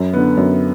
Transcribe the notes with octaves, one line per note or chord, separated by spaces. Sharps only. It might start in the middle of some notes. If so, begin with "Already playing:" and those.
Already playing: F#2
D3 B3
F#2